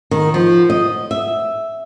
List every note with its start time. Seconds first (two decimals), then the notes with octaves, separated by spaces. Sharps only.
0.11 D#3
0.34 F3
0.70 D#5
1.11 E5